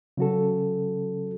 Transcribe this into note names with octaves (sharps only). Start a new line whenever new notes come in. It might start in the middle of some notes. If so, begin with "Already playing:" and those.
C#3 F#3 C#4 F#4 A4